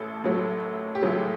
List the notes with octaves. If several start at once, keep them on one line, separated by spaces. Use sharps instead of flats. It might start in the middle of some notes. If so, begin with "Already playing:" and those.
Already playing: A1 A2 A4
A1 A2 F#3 A3
G4
A1 A2 F#3 A3 G#4